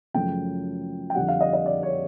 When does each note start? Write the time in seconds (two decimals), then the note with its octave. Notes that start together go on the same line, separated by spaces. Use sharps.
0.14 F#2 C#3 F3 A3 G5
1.10 G5
1.15 F2 D3 G3 F#5
1.28 F5
1.41 D#5
1.53 D#5
1.66 D5
1.83 C#5